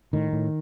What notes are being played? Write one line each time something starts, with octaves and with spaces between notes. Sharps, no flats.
A2 D#3
A2